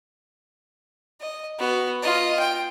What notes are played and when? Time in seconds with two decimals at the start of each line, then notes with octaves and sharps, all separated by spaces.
1.21 D#5
1.59 B3 F#4
2.03 F4 D#5
2.39 G5